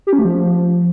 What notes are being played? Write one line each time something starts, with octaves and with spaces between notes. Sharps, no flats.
G4
C#4
A3
F3